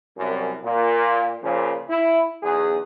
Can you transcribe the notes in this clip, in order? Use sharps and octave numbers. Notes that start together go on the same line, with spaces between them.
C2 F#2
A#2
A#2 C#3 F3
E4
B1 E2 G#4